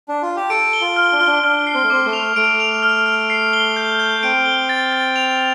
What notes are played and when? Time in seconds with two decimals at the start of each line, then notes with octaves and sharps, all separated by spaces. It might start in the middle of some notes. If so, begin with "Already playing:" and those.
0.08 D4
0.22 F4
0.36 G4
0.50 A4 D7
0.73 G7
0.81 F4
0.96 F6
1.12 D4
1.20 F4 F6
1.27 D4
1.43 D4 F6
1.67 C7
1.74 C4
1.83 A3
1.90 C4 D6
2.06 A3
2.13 F7
2.36 A3 D7
2.60 F7
2.83 F6
3.06 F6
3.30 C7
3.53 G7
3.76 G6
4.00 G6
4.23 C4 D7
4.46 G7
4.69 A6
4.93 A6
5.16 F7